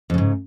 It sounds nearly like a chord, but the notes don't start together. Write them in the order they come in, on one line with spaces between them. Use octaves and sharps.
F2 C#3 G#2